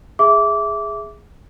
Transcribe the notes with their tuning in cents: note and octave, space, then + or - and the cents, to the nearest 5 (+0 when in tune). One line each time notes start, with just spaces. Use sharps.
G#4 +0 E5 +0 D6 -20